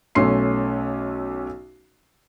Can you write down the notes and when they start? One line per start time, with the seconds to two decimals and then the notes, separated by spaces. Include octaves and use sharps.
0.15 B1 A3 C#4 C6 C7